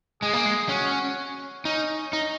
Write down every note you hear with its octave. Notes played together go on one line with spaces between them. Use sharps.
G#3 G#4
A#3
G#3
C#4 F#4
C#4 D#4
D#4